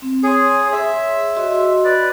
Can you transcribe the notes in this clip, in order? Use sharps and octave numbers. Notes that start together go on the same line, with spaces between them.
C4
G#4 C#5 C6
G#4 C#5 E5 C6
F#4 D#5 C6
B4 D5